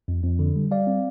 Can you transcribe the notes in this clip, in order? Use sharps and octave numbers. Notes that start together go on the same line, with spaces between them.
F2
F2
D3
G3
G3 D5 F5
C4